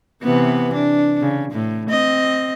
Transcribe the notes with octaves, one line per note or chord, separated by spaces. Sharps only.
C3 E3 B3
D4
C#3
A2
C4 D#5